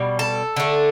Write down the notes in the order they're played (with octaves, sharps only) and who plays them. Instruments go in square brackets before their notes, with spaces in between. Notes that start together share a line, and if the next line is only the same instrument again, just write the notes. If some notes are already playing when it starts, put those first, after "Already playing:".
Already playing: [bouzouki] B2 G3
A4
D3 A3